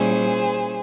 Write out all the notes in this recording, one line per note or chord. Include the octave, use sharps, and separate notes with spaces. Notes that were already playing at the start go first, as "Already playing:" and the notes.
Already playing: A#2 G3 C#4 E4 G#4 C5